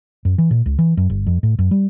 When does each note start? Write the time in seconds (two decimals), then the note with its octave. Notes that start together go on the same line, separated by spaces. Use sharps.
0.25 F#2
0.38 E3
0.51 A#2
0.66 C#2
0.79 E3
0.97 F#2
1.10 G1
1.26 F2
1.43 A2
1.59 F#2
1.71 G3